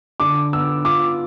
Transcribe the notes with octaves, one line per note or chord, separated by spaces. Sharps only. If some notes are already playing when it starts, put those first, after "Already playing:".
D3 D6
B3 E6
F4 D6